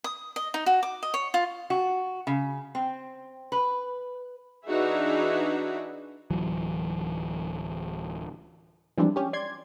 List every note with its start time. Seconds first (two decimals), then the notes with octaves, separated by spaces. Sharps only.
0.04 D#6
0.36 D#5
0.54 D#4
0.66 F#4
0.83 D6
1.03 D#5
1.14 C#5
1.34 F4
1.70 F#4
2.27 C#3
2.75 C4
3.52 B4
4.67 E3 D4 D#4 F#4 G#4 E5
6.30 D1 E3 F#3
8.97 E3 F3 G3 G#3 C4 D4
9.16 C#4 G4
9.33 D5 C6 G#6